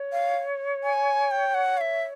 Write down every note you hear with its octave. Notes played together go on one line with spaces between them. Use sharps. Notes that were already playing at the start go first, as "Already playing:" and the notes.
Already playing: C#5
F5
G#5
G5
F#5
F5
E5